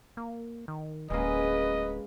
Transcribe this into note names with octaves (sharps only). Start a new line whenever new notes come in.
A#3
D#3
D1 G#3 A#3 C#4 B4 D#5